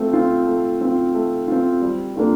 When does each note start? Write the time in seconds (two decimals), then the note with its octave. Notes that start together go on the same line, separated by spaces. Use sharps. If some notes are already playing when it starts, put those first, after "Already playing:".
Already playing: A3 C4 F4
0.13 C4 F4
0.47 A3
0.81 C4 F4
1.14 A3
1.48 C4 F4
1.82 G3
2.16 A#3 D4 F4 A4